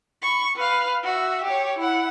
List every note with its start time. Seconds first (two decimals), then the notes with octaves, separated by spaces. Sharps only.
0.22 B5 C#6
0.56 B4 F5
1.04 F#4 E5
1.44 G4 C#5
1.79 E4 F#5